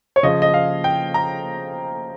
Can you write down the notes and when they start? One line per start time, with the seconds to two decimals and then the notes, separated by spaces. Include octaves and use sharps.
0.16 C#5
0.23 C#3 F3 D#5
0.42 D#5
0.54 F5
0.84 G5
1.14 A#5